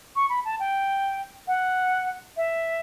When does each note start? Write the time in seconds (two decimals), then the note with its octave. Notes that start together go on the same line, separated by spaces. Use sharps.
0.15 C#6
0.29 B5
0.44 A5
0.59 G5
1.47 F#5
2.36 E5